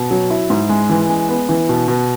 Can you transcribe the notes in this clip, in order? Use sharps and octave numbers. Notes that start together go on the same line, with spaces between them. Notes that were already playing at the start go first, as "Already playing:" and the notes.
Already playing: B2
F#3
E4
G#2
G#3
E3
G#3
B3
E3
B2
B2